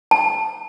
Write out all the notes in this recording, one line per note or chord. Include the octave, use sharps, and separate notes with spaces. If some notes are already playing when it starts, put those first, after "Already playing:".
A5